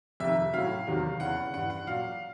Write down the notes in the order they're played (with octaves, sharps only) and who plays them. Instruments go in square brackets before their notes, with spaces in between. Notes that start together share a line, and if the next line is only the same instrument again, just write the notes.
[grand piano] F2 C3 D#3 E5
A2 F#3 F5
E2 C3 D#3 F#3
E2 C#3 E3 F#5
G2 E3 F#5
F#5
A#2 F#3 F5